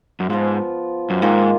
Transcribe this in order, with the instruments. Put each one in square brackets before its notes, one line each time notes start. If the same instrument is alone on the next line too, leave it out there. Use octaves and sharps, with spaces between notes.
[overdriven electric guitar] F#2
[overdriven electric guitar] G#2 [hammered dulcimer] F3 B3 F4
[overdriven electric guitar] F#2
[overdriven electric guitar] G#2 [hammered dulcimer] D#3 A#3 F4 G#4